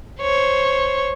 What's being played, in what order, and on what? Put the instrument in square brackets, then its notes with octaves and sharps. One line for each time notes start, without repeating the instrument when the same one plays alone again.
[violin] C5 C#5